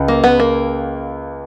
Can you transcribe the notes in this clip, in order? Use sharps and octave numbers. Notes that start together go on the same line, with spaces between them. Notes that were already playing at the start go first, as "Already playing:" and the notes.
Already playing: C#2
A#3
B3
A#3